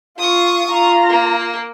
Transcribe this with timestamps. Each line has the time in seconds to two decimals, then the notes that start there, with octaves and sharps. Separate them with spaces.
0.19 F4 C#6 D#6
0.69 F4 A#5
1.09 A#3